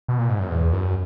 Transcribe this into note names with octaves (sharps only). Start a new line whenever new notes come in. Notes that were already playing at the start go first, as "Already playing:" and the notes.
B2
A#2
G#2
F#2
E2
F#2